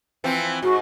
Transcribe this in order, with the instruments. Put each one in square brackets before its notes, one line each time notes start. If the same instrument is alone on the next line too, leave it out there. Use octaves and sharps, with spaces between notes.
[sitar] E3 F3 C4
[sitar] G#2 [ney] F#4